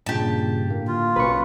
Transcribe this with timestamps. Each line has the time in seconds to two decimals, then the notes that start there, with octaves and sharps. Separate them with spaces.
0.06 G2 A#2 C#3 G4 A5
0.67 A2 D3 A#3
0.88 F4
1.16 B1 B2 C#4 B4 C#6